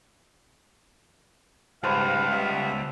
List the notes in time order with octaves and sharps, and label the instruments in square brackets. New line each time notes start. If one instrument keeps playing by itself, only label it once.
[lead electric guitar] C#2 [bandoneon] G#2 G3 [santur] B4 C5 A5 [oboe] F5
[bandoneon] G3 B3 E5